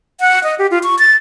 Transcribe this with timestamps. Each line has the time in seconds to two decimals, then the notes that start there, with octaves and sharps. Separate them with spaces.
0.20 F#5
0.44 D#5
0.59 G4
0.71 F4
0.83 C#6
0.99 A6